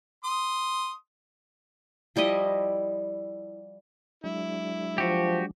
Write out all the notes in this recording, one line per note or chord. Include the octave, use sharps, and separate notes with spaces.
C6 D#6
F3 G3 E4 D#5
F#3 G#3 D4 E4
F3 F#4 G4